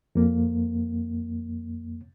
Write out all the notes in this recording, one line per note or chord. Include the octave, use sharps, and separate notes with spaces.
F2 A#3